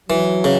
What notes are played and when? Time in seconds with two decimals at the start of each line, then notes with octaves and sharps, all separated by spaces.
0.09 E3 F#3
0.44 C#3